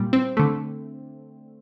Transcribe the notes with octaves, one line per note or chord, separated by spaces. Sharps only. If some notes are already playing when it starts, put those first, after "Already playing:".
Already playing: A#2 G3
C4
D3 A3